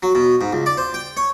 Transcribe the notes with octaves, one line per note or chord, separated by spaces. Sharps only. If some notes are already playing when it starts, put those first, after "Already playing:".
F#3
B2
G#2
C#2
D5
C5
G5
C#5